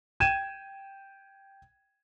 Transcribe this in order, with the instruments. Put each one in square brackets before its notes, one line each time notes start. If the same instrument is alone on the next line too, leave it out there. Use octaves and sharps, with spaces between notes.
[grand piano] G5 G#6 D#7 E7